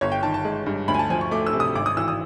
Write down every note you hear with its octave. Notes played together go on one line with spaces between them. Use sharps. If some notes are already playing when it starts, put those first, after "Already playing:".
G1 C#5
G5
D#3 A5
A5
G#3
G2
D2 B5
G#5
A5
F3 G#5
C#6
A3 D6
E6
C3
D#6
G#1 D6
D#6
E3 E6
D#6